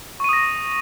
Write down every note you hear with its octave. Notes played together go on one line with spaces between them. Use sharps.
C#6 D#6 A#6 D#7